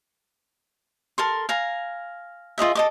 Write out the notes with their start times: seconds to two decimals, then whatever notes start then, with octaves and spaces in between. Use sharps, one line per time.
1.18 A4 A#4 C6
1.49 F5 G#5 A#5
2.58 F4 G#4 D#5 E5
2.75 A4 D#5 D6